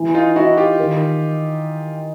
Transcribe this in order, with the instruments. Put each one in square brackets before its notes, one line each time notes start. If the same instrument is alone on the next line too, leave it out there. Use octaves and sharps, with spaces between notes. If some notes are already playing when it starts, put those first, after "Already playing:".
Already playing: [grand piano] E3
[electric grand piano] D#4 F4
[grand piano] D#4 [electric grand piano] E4 F#4
[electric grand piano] F4 G4
[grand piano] D#3